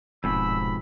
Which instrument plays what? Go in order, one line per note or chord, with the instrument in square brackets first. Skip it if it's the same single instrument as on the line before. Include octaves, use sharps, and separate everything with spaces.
[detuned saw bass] D#1 [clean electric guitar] F2 G#2 B2 [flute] B5 [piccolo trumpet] E6